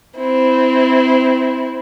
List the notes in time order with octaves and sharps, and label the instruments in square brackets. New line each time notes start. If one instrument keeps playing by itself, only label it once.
[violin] C4 E4